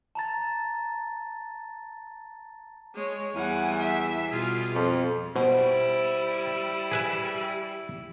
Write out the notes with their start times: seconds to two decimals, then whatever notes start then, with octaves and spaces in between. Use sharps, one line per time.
0.15 A5 A#5 A6
2.94 G#3 C#5
3.35 E2 G3 F#5 G#5
3.79 E5
4.30 B2 G3 F4 G#4
4.74 F2
5.36 B2 G3 E4 C5
6.91 G#4 B4 E5